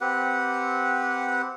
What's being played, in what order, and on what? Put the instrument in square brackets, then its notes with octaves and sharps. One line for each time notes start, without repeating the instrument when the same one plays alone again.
[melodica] C4 G4 B4 F#5